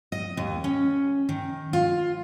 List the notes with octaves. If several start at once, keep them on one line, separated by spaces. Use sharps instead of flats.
D#5
D#2
C#4
D#3
F4